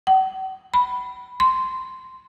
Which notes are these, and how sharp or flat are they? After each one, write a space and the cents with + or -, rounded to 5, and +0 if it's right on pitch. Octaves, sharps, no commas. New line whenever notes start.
F#5 +45
B5 -5
C6 -10